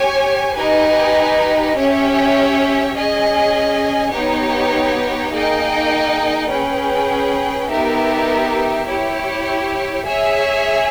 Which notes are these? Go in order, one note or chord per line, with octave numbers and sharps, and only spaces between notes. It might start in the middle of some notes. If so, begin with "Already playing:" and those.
Already playing: G4 C#5 G#5
D#4 G4 B4 D#5 G#5
C#4 G4 C#5 E5
C#4 G#4 D#5 G#5
B3 D#4 G4 C#5
A#3 D#4 G#4 D#5 G5
C#4 G#4 B4 G5
B3 D#4 G4 A#4 E5
E4 G4 C#5
G#4 C#5 E5 G#5